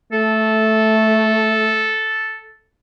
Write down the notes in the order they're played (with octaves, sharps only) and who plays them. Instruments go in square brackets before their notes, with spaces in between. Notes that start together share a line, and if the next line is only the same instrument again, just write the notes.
[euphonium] A3 [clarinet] A4